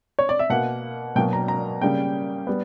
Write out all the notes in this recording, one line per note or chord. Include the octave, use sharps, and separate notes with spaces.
C#5
D5
E5
B2 A#3 F#5
B2 F#3 A#3 G5
A#5
A#5
C#3 G3 A#3 G5
G3 B3